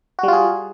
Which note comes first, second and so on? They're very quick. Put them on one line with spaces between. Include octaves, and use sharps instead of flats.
F#4 G3 F4 G#4